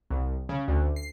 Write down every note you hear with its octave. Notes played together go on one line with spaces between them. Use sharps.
C2
C#3
D2
C7